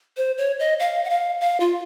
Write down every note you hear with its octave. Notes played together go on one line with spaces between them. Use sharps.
C5
C#5
D#5
F5
F#5
F5
F5
F4